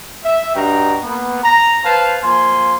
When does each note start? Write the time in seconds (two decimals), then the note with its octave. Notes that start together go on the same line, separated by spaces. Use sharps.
0.24 E5
0.55 G2 D#4 F#4 G5 A#5
1.02 A#3 B3
1.44 A#5
1.84 B4 C5 F5 A5
2.23 F3 A#3 G#5 C6